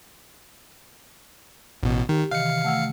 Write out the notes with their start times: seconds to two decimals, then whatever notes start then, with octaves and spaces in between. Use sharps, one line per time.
1.83 A1 B2
2.09 D#3 G4
2.31 C3 D#3 E3 F5 C#7
2.64 A3 F#5 E6